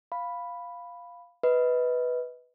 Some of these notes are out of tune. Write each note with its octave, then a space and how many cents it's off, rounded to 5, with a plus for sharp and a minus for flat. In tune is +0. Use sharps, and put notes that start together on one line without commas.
F5 +0 B5 +0
B4 +0 D#5 +30